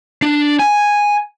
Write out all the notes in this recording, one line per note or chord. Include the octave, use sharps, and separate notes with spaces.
D4
G#5